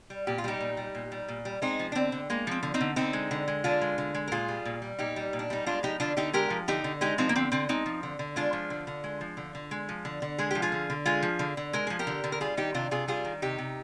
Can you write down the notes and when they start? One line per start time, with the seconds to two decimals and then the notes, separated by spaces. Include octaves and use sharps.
0.10 G3
0.27 A#2 G4
0.38 F4
0.44 G3 D#4 G4
0.60 A#2
0.77 G3
0.95 A#2
1.12 G3
1.28 A#2
1.45 G3
1.62 G#3 C4 D#4
1.79 F3
1.92 D4
1.95 D3 C4
2.12 D3
2.30 G#3 A#3
2.47 F3 C4
2.63 D3
2.74 C4 D#4
2.81 D3
2.96 D3 C4 D#4
3.13 G#3
3.31 D3
3.48 G#3
3.64 D3 D4 F4
3.81 G#3
3.98 D3
4.14 G#3
4.28 A#4
4.32 A#2 F4 G#4
4.48 G3
4.65 A#2
4.82 G3
4.99 A#2 D#4 G4
5.16 G3
5.33 A#2
5.39 D4
5.50 G3 D#4
5.66 G#3 D4 F4
5.83 F3 D#4 G4
6.00 D3 D4 F4
6.17 D3 D#4 G4
6.33 G#3 G4 A#4
6.50 F3
6.68 D3 D#4 G4
6.84 D3
7.01 G#3 D#4 G4
7.18 F3 C4 D#4
7.29 A#3
7.36 D3 C4
7.52 D3 C4
7.69 G#3 C4 D#4
7.86 F3
8.03 D3
8.19 D3
8.36 G#3 D4 F4
8.53 F3
8.70 D3
8.87 D3
9.04 G#3
9.21 F3
9.37 D3
9.55 D3
9.71 G#3
9.89 F3
10.05 D3
10.22 D3
10.38 G#3 G#4
10.51 F3 G4
10.62 F4 G#4
10.72 D3
10.90 D3
11.06 G#3 F4 G#4
11.23 F3
11.39 D3
11.57 D3
11.73 G#3 A#4
11.87 F3 G#4
11.99 G4 A#4
12.07 D3
12.24 D3
12.32 A#4
12.40 G3 F4 G#4
12.57 D#3 D#4 G4
12.74 C3 D4 F4
12.91 C3 F4 G#4
13.08 G3 F4 G#4
13.25 D#3
13.42 C3 D#4 G4
13.58 C3